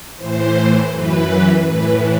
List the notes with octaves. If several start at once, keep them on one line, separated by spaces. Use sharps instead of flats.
A2 E3 C5
F#2 E3 B4
A2 E3 B4